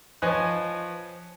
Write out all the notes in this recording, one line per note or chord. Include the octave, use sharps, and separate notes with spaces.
F3 B4 C#5 D#5 G#5 F#6